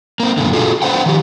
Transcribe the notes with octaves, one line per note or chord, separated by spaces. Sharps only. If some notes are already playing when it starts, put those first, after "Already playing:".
A#3 C4
F#2 A#2 D3
F4 F#4 G#4 A4
B4 C5 F#5 G5
D#3 F3 G4